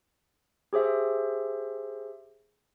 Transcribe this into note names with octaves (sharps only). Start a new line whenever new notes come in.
G4 G#4 C5 E5